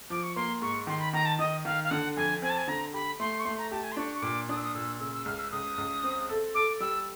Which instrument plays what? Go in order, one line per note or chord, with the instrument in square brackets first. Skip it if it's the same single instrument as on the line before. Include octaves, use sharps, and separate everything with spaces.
[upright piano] F3 [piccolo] D6
[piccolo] C#6
[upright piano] A#3 [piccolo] C6
[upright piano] G#2 [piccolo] C#6
[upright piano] D#3 [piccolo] C6
[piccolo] B5
[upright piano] D#3 [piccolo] A#5
[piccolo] A5
[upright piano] D#3 [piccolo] D#5
[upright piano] D#3 [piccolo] F5
[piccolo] F5
[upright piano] D3 [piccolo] F#5
[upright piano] F2 [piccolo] G#5
[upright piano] C4 [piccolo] G#5
[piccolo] A5
G#5
[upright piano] D3 [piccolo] A#5
[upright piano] G4 [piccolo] B5
[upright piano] A3 [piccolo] C6
[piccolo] C#6
[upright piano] A3 [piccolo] C6
[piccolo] A#5
[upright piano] G4 [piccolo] A5
[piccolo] G#5
C6
[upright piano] D4 [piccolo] C#6
[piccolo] C#6
[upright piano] A#2 [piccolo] D6
[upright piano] D4 [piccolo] D#6
[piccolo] E6
D#6
[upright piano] A#2 [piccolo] E6
[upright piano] C#3 [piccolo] E6
[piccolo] E6
[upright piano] C#2 [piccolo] F6
[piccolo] E6
[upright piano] C#2 [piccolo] D#6
[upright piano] C#2
C4
A4
[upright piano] A4 [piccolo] D6
[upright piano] G3 [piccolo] E6